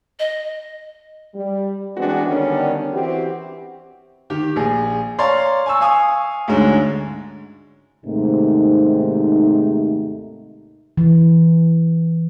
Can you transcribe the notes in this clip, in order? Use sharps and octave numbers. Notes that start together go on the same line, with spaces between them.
D#5
G3
E3 G#3 B3 C4 D4 F#4
D3 D#3 G3 B3 C#4 D4
E3 C4 F#4 G4
D#3 G4
A#1 G#4
C#5 D5 F5 A#5 C6 C#6
G#5 C#6 E6
F5 G#5 C#6 D#6
D2 G#2 D3 G#3 C#4
D#2 G#2 C3 A3 D#4
E3